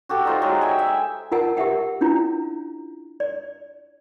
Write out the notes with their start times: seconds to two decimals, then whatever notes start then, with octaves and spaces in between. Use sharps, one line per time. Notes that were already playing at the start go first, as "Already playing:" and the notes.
0.09 F#4 G4 A4
0.25 D#4 F4 C5
0.42 F#3 G#3
0.61 E5 G5 G#5
0.79 E5
1.32 F4 A#4 F#5 G#5 A5
1.57 G4 A#4 E5 F#5 G5
2.01 C#4 D4 E4 F4 A#5
3.20 D5